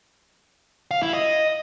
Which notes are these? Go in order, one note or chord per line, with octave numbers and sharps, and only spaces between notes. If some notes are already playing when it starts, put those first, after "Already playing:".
F5
E4
D#5